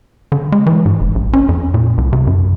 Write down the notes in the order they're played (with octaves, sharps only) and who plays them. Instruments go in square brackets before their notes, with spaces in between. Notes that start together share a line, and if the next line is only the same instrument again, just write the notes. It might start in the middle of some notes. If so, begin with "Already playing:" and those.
[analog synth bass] D3
G#3
E3
G#2
F1
A#1
C#4
F2
A#2
C2
C3
F#2